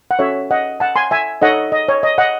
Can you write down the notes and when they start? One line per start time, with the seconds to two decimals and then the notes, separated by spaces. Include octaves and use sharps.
0.11 F#5
0.19 C#4 F#4 A4 C#5 E5
0.51 D#5 F#5
0.80 F#5 A5
0.96 G#5 C6
1.11 E5 G#5
1.42 D#4 A4 C#5 D#5 F#5
1.72 D#5
1.89 C#5
2.03 D#5
2.18 D#5 F#5